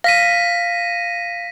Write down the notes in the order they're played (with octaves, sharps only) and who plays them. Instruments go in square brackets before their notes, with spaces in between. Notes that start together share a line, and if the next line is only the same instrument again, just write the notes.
[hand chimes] F5 [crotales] A#6 B6 D#7